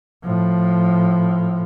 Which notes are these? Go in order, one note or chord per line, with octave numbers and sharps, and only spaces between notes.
A2 F3